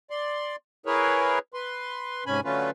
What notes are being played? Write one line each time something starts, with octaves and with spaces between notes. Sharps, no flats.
D5 C6
E4 G#4 A#4 B4 C#5
B4 C6
G#2 C3 C#4 G#5 B5
D3 F#3 A3 C#4 F4 B4